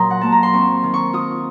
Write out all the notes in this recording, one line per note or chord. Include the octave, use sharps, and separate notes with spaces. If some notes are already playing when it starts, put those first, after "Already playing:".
Already playing: A#2 F#3 A#5 C6 D#6
F#5
A#3 A5
A#5
C6
C4 C#6
D#3
C#6
F4 D#6